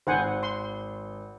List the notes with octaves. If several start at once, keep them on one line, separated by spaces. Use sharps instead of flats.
G#1 C5 F#5 G#5
C6